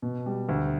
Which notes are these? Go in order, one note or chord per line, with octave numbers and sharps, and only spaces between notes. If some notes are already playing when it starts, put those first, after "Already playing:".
B2
G3
D2